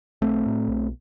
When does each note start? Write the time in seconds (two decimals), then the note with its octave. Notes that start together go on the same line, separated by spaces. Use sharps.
0.21 B1 A3 C4
0.45 A2
0.68 B1